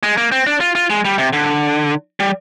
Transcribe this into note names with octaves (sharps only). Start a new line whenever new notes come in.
G#3
A#3
C4
D4
F4
F4
G#3
G3
C3
D3
G3